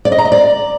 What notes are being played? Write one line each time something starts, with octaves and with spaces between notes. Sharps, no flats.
D5
D#5
A#5
D#5
D5